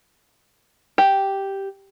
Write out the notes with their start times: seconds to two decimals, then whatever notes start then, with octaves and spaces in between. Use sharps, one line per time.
0.98 G4